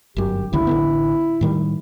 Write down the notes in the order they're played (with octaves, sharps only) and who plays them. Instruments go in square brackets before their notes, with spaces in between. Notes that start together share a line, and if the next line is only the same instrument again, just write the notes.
[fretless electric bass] G1 F#2 [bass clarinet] G4
[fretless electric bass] F#1 D2 C#3 [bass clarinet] E4
[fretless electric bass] A1 D3 B3
A2 D#3 G3